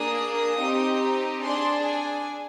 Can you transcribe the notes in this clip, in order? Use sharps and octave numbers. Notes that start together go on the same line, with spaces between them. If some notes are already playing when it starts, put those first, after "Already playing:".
Already playing: A#3 D4 G#4 D#6
C4 D#4 G4
D4 G#4 C6
G#5